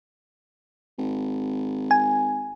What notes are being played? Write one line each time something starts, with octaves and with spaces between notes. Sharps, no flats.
G#1
G#5